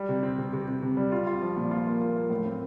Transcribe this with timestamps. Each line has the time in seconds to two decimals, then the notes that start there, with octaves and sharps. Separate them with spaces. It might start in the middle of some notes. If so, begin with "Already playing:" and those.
Already playing: G3
0.09 C3
0.23 C4
0.38 C3
0.53 C3
0.68 C3
0.82 C3
0.97 G3
1.12 F4
1.27 F4
1.42 F3
1.57 A#2
1.71 F4
1.86 A#3
2.01 A#3
2.16 A#3
2.30 A2
2.46 C4